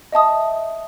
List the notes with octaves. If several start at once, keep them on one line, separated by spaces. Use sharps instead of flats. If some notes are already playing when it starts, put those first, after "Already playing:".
D#5 E5 A5 D#6